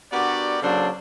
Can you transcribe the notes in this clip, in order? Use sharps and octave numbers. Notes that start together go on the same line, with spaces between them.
B3 D4 F#4 G4 A#4 D5
C#3 F#3 A#3 D4 A4 C5